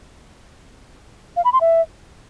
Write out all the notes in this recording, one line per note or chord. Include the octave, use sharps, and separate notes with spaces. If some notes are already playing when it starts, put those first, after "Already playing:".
F5
B5
C6
E5